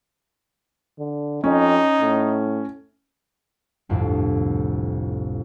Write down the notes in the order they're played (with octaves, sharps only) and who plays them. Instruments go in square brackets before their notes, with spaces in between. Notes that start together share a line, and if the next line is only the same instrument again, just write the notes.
[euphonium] D3
[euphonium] F2 [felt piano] C#4 [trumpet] D#4
[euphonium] A2
[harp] G1 C2 F2 A2